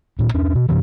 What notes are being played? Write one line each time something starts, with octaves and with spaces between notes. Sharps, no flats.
D1 A#2
E2 C#4 D4
B2
F#2 C3 E3